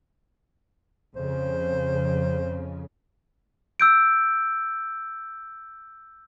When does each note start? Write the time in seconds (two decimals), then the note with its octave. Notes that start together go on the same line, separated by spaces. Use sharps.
1.16 F2 C#3 C5
3.80 E6 G6 D7